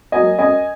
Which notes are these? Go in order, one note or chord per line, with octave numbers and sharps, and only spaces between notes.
F#3 A#3 D#5 G#5
F#2 D#5 G#5